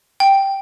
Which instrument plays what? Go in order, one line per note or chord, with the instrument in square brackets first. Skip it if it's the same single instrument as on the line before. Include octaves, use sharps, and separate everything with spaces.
[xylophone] G5